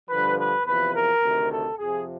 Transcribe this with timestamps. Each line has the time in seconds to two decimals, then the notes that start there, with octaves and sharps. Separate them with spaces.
0.10 G2 D3 F3 B4
0.39 B4
0.66 E2 C3 F3 B4
0.94 A#4
1.22 D2 C3 D#3
1.51 A4
1.79 F2 C3 F3 G#4